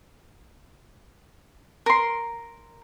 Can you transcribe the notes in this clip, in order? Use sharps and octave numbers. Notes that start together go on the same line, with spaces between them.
A#4 C6